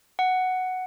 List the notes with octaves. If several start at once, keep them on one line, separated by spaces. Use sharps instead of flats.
F#5